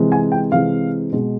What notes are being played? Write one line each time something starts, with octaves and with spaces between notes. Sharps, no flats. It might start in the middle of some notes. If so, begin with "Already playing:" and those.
Already playing: C3 E3 G#3
G#5
G5
C3 E3 G#3 F5
B2 G#3